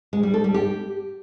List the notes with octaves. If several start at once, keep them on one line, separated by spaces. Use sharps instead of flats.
G#3
G3
A4
G3
G4